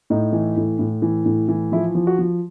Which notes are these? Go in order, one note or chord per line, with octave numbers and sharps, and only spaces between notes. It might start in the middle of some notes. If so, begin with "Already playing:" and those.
A2 D#4
E3
A2
A2
E3
A2
E3
F3 E4
F3
F#4
F3